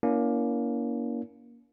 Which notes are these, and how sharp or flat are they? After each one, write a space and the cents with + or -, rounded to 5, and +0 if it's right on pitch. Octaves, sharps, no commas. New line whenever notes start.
A#3 +20 C#4 +35 E4 +0